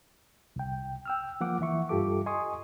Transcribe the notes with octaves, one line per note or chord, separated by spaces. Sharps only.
C2 G5
G5 E6 F6
F3 A#3 F#5 D6
E3 E5 C#6
G2 F4 G4 A4 D6
D#5 G#5 C6 C#6 D#6